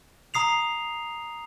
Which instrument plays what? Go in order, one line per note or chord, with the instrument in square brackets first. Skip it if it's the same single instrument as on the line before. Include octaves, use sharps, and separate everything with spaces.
[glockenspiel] A#5 D#6 C7 F7